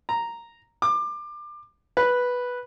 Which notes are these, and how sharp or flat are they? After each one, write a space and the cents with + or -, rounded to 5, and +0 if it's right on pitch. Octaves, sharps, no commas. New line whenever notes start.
A#5 -5
D6 +25
B4 -5